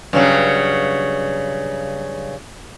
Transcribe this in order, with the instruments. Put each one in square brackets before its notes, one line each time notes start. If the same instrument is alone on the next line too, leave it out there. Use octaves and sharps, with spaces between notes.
[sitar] G2 C#3 F#3